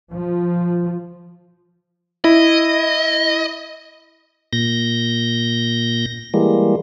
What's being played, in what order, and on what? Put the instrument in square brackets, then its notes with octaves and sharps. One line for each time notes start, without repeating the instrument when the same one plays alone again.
[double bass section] F3
[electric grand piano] E4 [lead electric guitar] D#5
[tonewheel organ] A#2 G6 A#6
E3 G3 G#3 A#3